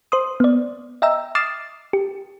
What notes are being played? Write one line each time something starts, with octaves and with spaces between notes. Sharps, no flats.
C5 C6 D#6
B3 D5
D#5 E5 G5 A#5 E6
D6 D#6 F6 A6 C7 E7
G4